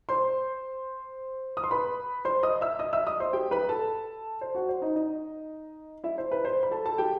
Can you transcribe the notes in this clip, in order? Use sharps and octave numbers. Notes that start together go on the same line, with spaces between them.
C5 C6
D#6
C6
B4 B5
C5 C6
D#5 D#6
E5 E6
D#5 D#6
E5 E6
D#5 D#6
C5 C6
G4 G5
B4 B5
A4 A5
C5
F#4 F#5
C5
D#4 D#5
D#4 D#5
E4 E5
C5
B4
C5
B5
A4 A5
A4 A5
G4 G5